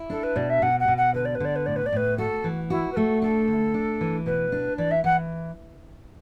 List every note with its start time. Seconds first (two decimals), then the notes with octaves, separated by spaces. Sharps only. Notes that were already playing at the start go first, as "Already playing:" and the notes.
Already playing: E4
0.10 D4 A4
0.23 B4
0.36 B2 D5
0.49 E5
0.62 B2 F#5
0.80 F#5
0.88 B2
0.97 F#5
1.14 D3 B4
1.25 D5
1.35 B4
1.40 D3 D5
1.55 B4
1.66 A2 D5
1.76 B4
1.86 D5
1.92 A2 B4
2.18 F#4 A4
2.44 E3
2.70 E4 F#4
2.92 B4
2.96 A3 A4
3.22 D4 A4
3.48 D3
3.74 D4
4.01 E3
4.26 B2 B4
4.52 D4
4.78 E3 D5
4.91 E5
5.04 E3 F#5